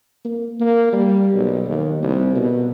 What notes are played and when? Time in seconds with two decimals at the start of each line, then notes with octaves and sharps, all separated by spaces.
0.25 A#3
0.61 A#3
0.93 G3
1.34 B1
1.66 D#2
2.03 C2
2.36 B2